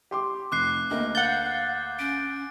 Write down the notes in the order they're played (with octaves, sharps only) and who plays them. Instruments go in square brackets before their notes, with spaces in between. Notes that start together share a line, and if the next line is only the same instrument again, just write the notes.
[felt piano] G4 C6 D6
[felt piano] F1 [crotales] D6 F#6 C7
[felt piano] D2 A#3 [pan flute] D#5
[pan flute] F5 [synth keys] F#5 G6 [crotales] A6
[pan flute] C#4 [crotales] D7